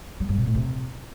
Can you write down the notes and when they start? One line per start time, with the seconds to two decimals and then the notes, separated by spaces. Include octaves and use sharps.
0.20 F#3
0.29 G2
0.37 B2
0.46 A2
0.55 C3